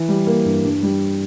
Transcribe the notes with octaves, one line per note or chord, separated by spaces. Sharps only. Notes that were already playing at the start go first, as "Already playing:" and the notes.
Already playing: E3
G3
A#3
G2
G2
G3